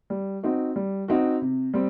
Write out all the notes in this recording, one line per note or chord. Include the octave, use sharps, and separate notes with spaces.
G3
C4 D#4 F#4
G3
C4 D#4 F#4
C3
G3 C4